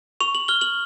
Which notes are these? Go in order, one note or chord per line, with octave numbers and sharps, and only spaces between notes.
C#6 F7
F#7
F6 G7
F#7